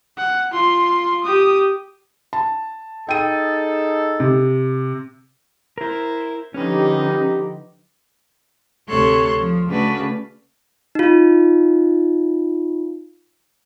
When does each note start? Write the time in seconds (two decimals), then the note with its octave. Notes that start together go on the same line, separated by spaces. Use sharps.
0.18 F#5
0.53 F4 C6
1.24 G4 D#6
2.33 A5
3.09 D#4 G#4 A4 G5 D#7
4.20 C3
5.78 E4 A#4 C5 E5
6.54 D3 F3 C#4 D#4 G4 B4 D#5
8.88 D2 C3 A4 C#5 C6 F#6
9.38 F3
9.68 C#3 A3 D4 F#4 B4
10.95 D#4 F4